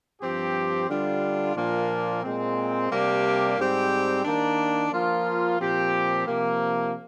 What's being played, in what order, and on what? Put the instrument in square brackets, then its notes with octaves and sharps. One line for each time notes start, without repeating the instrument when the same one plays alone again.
[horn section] G2 F3 C4 G4
D3 G3 D4 F4
A#2 F3 A#3 D4 F4
A#2 G#3 C4
C3 G3 A#3 D4 G4
G#2 G3 C4 G4
D#3 A#3 D4
F3 A#3 F4
A#2 F3 C4 G4
C3 F3 A#3